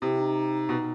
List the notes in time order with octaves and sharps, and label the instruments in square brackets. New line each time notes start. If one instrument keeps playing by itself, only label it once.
[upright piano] C3 [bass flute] E4
[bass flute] D#4
[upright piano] B2